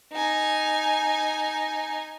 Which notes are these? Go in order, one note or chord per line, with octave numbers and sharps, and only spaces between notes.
D#4 G#5